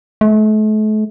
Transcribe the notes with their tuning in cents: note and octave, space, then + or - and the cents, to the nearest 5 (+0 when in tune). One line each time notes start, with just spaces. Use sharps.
A3 -40